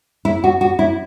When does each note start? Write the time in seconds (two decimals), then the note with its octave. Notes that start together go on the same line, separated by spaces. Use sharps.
0.25 E4
0.44 F#4
0.61 F#4
0.79 E4